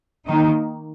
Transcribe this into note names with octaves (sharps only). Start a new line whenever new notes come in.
D#3 A#3 D#4